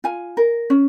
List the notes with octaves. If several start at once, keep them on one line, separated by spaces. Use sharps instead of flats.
F4 G#5
A#4
C#4